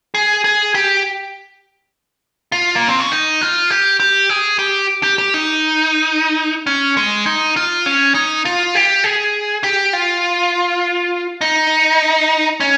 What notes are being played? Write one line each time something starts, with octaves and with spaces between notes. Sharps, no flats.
G#4
G#4
G4
F4
A#3
C4
C#4
D#4
F4
G4
G4
G#4
G4
G4
G4
D#4
C#4
G#3
D#4
F4
C#4
D#4
F4
G4
G#4
G4
F4
D#4
C#4